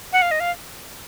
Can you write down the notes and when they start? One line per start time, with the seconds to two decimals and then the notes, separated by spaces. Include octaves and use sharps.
0.13 F#5
0.22 F5
0.31 D#5
0.40 F5